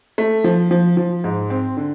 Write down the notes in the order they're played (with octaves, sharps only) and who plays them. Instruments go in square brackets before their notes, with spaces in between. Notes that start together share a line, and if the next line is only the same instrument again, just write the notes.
[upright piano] A3
F3
F3
F3
G#2
C4
D3